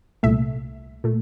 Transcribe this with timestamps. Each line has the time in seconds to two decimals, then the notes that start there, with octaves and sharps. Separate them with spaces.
0.23 C2 A#2 A3 E5
1.04 A#2 A3